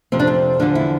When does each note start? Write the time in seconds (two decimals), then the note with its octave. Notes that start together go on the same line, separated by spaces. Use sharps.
0.12 F2 C3 F3 C4
0.19 D4
0.27 C4
0.59 E2 D3 F3 D4
0.75 E4